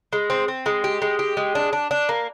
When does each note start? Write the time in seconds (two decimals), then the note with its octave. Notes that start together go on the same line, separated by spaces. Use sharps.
0.13 G#3
0.30 C4
0.48 C4
0.66 G#3
0.84 G4
1.02 G#3
1.19 G4
1.37 G#3
1.55 D4
1.73 D4
1.91 D4
2.09 A#3